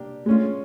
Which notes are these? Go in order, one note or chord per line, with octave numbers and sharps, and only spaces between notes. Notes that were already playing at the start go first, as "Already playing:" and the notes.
Already playing: A#3 D4 G4
G#3 A3 C#4 F4